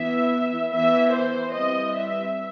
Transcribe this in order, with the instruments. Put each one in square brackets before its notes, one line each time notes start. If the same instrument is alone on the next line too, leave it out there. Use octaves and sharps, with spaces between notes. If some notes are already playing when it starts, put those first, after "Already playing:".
Already playing: [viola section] E3 B3 E5
E3 B3 E5
C5
E3 G3 C4 D#5
E5